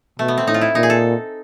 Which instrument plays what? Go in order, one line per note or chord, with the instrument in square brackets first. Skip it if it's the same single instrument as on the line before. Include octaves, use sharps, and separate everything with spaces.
[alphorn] B2 [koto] A3
[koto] B3
C4
[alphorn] A2 [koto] D#4
[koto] F4
E4
[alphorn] A#2 [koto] D#4
[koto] G#4
A4